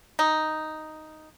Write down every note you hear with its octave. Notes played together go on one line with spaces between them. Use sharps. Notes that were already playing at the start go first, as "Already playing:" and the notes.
D#4